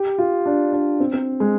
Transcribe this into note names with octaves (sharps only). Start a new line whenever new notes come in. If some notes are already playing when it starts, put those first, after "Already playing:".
Already playing: G4
F4
D4
D4
C4
C4
G#3